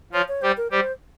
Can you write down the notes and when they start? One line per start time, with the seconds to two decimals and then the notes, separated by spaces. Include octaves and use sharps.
0.12 F3 F4 C#5
0.28 C#5
0.42 G3 G4 C5
0.57 A#4
0.71 G3 G4 C5